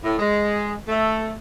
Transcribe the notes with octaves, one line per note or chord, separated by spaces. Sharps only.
A2
G#3
A3